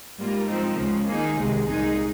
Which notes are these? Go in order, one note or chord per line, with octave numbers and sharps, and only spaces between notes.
G#2 G3 A#3 F4 A#4
G#2 F3 C4 D#4
C#2 C#3 F3
D#3 A#3 D#4 G#4
C2 C3 D#3 G#3
C2 A#2 G#3 D#4 G#4